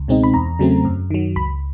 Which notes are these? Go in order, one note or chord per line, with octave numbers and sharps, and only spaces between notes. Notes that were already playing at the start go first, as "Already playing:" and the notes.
Already playing: C#2
B2 G#3 C4 D#4
B5
E2 A#5
C#3 F#3 A3 C4
F#2
D#3 F#3
C#2 B5